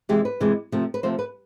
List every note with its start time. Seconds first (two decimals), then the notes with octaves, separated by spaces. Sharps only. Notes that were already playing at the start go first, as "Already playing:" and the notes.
0.09 C3 E3 G#3 G4
0.25 B4
0.40 C3 E3 G#3
0.72 C3 F3 A3
0.94 B4
1.03 C3 F3 A3 C5
1.19 B4